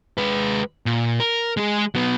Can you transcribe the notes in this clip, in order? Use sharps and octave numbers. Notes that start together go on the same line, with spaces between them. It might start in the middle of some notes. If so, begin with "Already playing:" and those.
G#3 B4
A#2
A#4
G#3 G#4
F#3 B3